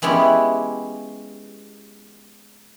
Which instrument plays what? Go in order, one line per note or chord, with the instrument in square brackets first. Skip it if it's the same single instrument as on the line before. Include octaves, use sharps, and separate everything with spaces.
[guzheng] G#3 B3 C#4 E4 G4